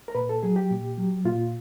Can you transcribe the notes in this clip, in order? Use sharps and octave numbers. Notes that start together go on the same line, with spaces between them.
A#4
A#2 B4
A4
F#3 G#4
G4
A#2
F#3
A#2 F4